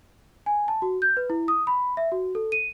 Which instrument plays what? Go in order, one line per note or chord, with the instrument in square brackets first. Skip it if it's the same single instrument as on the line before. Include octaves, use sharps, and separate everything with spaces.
[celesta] G#5
A5
F#4
G6
B4
E4
D#6
B5
E5
F#4
A4
D#7